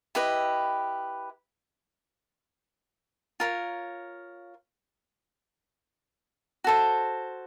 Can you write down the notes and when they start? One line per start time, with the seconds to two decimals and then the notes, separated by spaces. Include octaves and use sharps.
0.15 E4 G4 B4 D#5
3.40 F4 A#4 C#5
6.64 F#4 A4 C5